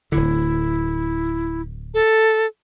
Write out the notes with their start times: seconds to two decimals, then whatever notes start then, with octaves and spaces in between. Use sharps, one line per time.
0.12 D1 D2 D3 E4
1.94 A4